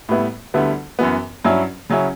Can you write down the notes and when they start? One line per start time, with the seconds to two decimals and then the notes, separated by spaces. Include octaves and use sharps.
0.09 A2 G3 B3 E4
0.54 D2 D3 G3 B3 E4
0.99 F#2 E3 B3
1.44 G2 F#3 C#4 E4
1.89 C#3 F#3 C#4 E4